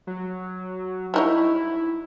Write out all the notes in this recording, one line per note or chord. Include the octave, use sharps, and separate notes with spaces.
F#3
G3 D#4 E4 C#5